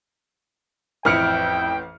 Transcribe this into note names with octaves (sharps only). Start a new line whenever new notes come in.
A1 F2 E4 G5 F6 C#7 D7